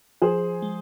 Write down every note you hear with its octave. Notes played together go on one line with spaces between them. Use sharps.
F3 G#4 C5
G#3